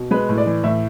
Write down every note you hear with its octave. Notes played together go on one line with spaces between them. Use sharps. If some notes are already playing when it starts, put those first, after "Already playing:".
Already playing: B2
G#3 B4
A2
D5
E3
A2 E5